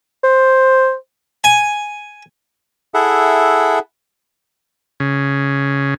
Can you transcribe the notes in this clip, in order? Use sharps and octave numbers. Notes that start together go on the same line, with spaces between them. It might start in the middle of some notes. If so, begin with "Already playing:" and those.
C5
G#5
E4 G#4 A4 E5 F#5
C#3